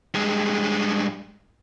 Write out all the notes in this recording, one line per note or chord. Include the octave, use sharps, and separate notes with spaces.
G2 G#3